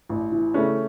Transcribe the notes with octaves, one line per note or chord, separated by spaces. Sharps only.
A1
E3
C#3 A3 C#4